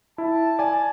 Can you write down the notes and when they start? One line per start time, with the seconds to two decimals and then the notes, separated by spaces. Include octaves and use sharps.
0.18 E4 A5
0.59 D5 G#5